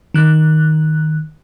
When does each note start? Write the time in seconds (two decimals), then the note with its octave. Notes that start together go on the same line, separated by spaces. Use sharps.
0.14 D#3 F#6